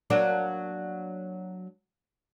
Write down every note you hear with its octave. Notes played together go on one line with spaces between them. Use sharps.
F#3 A#3 D4